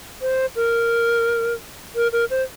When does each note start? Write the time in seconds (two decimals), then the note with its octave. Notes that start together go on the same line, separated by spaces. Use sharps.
0.21 C5
0.56 A#4
1.95 A#4
2.13 A#4
2.30 C5